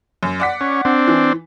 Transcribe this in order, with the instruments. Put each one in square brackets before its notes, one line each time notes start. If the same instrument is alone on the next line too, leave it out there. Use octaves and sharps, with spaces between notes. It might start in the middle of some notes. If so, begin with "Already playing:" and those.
[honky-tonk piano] F#2
D5 F#5 B6
[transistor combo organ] C#4
C4 D4
[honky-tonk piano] E3